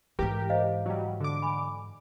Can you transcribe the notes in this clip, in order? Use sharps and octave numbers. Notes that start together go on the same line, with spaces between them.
G#2 E3 G4 A#4 B4
C5 D#5 F5
F#3 G3
D3 D6
G#5 B5